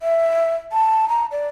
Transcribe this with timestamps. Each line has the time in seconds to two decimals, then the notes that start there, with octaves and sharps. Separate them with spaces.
0.01 E5
0.72 A5
1.09 A#5
1.32 D5